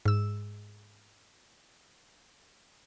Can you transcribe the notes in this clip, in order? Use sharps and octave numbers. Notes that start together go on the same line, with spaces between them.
G#2 E6